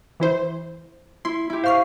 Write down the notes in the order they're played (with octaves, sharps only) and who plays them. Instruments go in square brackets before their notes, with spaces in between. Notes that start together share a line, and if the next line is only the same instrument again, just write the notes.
[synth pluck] E3 E4 C5
[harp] E4 [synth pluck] C6
[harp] E4 G4
[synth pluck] C5 F6 C7 [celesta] F5 C#6